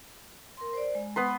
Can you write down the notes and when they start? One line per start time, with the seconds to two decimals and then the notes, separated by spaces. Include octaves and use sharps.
0.57 A#4 C6
0.73 C5 D5
0.95 G#3
1.16 B3 B4 C6